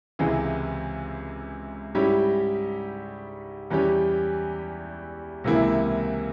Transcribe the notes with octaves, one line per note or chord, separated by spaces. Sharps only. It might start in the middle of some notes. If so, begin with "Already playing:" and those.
C#2 C3 E3 G#3
G#2 G3 C#4 E4 G4
E2 E3 G3 C#4 G4
C#2 C3 E3 A#3 E4